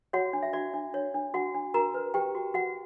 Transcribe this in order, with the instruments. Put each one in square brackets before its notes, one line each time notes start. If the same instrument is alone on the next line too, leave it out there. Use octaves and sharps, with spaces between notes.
[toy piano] F#4 C#5 F#5
D4
E5
F#4 D5
D4
C#5
D4
F#4 F#5
D4
F#4 A#4 A#5
B4
G4 B4 G5
F#4
F#4 F#5